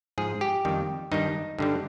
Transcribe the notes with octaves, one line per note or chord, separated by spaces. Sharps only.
G#2 F3 G#4
G4
F2 D#3 G3
G2 D#3 G3 D#4
G2 D3 G3